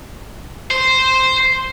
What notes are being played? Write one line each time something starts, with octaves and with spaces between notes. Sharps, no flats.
C5